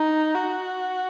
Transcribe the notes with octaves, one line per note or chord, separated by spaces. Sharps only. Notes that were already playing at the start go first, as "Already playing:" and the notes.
Already playing: D#4
F#4